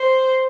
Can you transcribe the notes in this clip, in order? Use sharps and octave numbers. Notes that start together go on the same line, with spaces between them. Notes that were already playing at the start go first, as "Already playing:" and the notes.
Already playing: C5